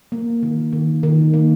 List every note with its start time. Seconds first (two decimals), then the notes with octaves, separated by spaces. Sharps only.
0.12 A#3
0.43 D#3
0.73 D#3
1.03 D#3
1.34 A#3